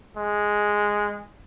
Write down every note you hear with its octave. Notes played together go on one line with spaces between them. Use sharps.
G#3